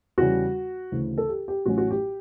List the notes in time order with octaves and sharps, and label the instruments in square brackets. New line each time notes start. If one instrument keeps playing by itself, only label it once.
[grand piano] E2 C#3 G3 C#4 F#4
D2 C#3 E3
A4
G4
G4
A1 A2 F#3 C#4 F#4
F#4
G4